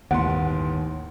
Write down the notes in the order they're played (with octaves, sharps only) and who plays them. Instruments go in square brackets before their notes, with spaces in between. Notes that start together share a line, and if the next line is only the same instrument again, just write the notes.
[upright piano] G1 A2 C6 [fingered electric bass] D#2 [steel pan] F#5